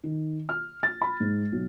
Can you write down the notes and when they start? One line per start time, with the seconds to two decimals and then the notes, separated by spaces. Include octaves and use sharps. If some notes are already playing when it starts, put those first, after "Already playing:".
0.03 D#3
0.49 F6
0.83 A6
1.01 B5
1.20 G#2
1.52 B1